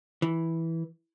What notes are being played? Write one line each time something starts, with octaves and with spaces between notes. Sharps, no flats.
E3